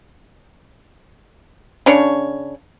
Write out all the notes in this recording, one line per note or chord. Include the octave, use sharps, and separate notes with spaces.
C#3 D4 C#5